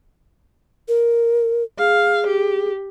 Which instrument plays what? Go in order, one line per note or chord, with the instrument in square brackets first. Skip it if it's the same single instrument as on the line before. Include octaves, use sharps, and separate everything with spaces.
[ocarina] A#4
[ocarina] G#4 [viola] F5
[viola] G4